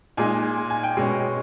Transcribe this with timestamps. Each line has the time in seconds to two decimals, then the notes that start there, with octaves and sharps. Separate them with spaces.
0.17 A#2 G#3 D#4 G#5
0.57 G#5
0.70 G#5
0.83 G5
0.97 B2 G#3 C#4